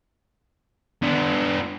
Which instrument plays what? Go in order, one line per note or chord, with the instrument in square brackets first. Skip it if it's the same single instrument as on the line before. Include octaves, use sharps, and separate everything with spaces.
[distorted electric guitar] B3 D4